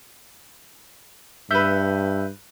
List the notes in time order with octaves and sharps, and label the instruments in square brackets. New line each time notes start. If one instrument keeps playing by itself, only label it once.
[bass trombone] G2 [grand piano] B4 E6 [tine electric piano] E5 G6